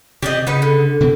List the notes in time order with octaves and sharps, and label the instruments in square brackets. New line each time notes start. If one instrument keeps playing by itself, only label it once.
[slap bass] C3 [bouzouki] G4 D5 D#5
[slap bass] C#3 [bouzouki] D#4 B4 F#5
[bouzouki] D3
[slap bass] B2 D#3 E3